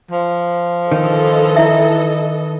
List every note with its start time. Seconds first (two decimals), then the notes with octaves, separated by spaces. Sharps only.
0.11 F3
0.92 D#3 E3 A4 D#5
1.56 E4 E5